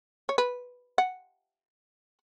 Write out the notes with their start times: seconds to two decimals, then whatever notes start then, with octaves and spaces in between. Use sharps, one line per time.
0.29 C#5
0.38 B4
0.98 F#5